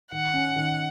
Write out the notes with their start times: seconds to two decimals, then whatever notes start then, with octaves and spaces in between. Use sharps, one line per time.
0.12 D#3 F#5
0.34 C#4
0.56 D#3